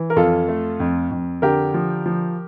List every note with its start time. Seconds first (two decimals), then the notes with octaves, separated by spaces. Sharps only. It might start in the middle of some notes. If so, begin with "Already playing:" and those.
Already playing: E3
0.10 A#4
0.16 F2 F4 A4
0.49 A3
0.80 F2
1.11 F2
1.42 D3 G4 A#4
1.74 F3
2.06 F3